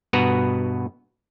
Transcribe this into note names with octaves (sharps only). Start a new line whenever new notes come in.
G2 B2 B3 F#4 B4 A#5